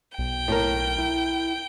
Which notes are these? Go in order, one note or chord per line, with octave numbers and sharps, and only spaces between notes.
B1 G5
A2 A#4
E4